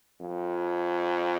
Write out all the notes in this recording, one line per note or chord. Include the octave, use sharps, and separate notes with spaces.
F2